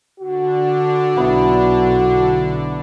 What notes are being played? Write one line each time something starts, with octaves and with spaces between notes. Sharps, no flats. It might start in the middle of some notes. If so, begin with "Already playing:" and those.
D3 D4 F#4
B1 B3 E4